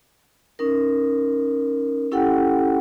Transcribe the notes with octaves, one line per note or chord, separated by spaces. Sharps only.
C#4 D#4 A#4
C#4 E4 G4 A4 F#5 G5